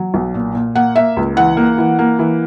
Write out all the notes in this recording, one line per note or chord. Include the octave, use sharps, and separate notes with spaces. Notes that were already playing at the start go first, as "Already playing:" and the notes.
Already playing: F#3
B1
A#2
A#2
A#3 F#5
A#3 E5
C#2
E3 F#5
A#3
E3
A#3
E3